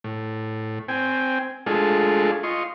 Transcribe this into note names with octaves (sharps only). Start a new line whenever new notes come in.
A2
C4 G5 G#5
G#3 A3 D4 F4 G#4 A4
F4 D#5 C6 C#6